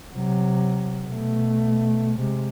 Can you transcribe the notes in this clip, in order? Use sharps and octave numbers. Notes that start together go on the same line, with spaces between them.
C3 F#3
B2 A3
C3 G#3